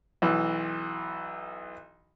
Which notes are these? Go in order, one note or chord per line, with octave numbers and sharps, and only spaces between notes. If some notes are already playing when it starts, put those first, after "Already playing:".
B1 E3